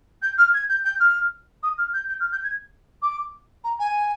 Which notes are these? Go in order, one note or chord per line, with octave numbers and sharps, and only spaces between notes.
G6
F6
G#6
G6
G6
F6
D#6
F6
G6
G6
F6
G6
G#6
D6
A#5
G#5